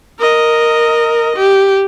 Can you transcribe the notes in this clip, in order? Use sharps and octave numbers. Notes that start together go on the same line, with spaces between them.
A#4 D#5
G4